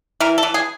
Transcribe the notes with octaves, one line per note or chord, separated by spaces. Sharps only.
E3 A#4
A4
E3
G#4